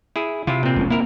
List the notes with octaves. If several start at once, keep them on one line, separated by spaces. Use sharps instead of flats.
E4 G#4
C3 E4 F4
A#2 C4
F1 G#3 C#4
A#3 C4 E4 A#4